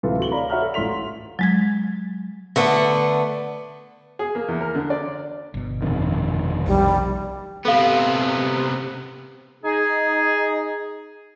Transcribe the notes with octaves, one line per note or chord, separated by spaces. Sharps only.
D1 C3 E3 F4 A4
F#4 F#7 G7
C#5 D5 F5 A#5 B5
F#4 C#5 E5 F#5 A#5 F6
A4
A1 F4 C6 B6 F7
F#3 G#3 G#6
D3 A3 B3
G#4
A#3
E2
A#4
D3
D5
G1 B2
F2 C3 D#3
B1 G3
C3 B3 A4 F5
D#4 G#4